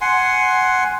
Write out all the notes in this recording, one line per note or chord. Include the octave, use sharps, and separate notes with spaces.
F#5 G#5 C6